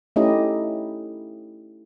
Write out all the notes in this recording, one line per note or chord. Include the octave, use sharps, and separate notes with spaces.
A3 C#4 D#4 E4 G4 D#5